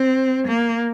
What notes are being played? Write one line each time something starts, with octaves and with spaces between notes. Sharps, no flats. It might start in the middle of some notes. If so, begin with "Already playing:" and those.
Already playing: C4
A#3